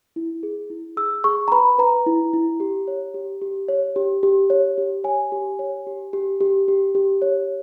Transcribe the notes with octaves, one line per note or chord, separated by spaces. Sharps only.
E4
G#4
E4
G#4 E6
G#4 C#6
A#5
B4 B5
B4 A#5
E4
E4
G4
C#5
G4
G4
C#5
G4
G4
C#5
G4
C#5 G#5
G4
C#5
G4
G4
G4
G4
G4
C#5